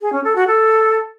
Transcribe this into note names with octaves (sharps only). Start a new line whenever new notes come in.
G#4
C#4
A4
F#4
A4